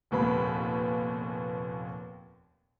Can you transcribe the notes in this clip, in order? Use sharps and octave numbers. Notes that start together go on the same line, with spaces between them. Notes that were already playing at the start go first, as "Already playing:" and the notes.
F1 D#2 A#2 B3 B5